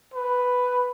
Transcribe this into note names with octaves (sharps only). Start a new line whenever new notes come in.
B4